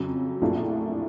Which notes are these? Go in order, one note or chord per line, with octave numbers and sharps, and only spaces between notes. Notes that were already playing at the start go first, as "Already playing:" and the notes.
Already playing: F2 C#3 F#3
A#1 A2 F3 A#3 D4